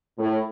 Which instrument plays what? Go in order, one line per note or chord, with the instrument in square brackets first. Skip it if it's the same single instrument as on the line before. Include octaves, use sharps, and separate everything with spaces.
[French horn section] A2